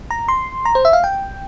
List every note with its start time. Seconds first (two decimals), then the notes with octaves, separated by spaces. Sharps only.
0.10 A#5
0.28 C6
0.65 A#5
0.75 C5
0.85 E5
0.93 F5
1.04 G5